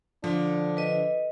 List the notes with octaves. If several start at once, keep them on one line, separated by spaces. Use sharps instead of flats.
D3 F3 D4
B4 D#5